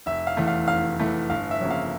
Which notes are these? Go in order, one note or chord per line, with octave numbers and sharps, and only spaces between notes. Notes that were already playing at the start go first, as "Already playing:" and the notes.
F1 E5
F5
E2 E3 A3
F5
F1 F5
E2 E3 A3
G1 F5
E5
F2 C#3 F3 A#3
F5